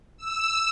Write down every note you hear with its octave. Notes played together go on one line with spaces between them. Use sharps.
E6